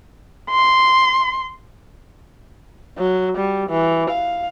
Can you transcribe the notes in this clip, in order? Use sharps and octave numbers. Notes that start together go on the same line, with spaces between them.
C6
F#3
G3
E3
F5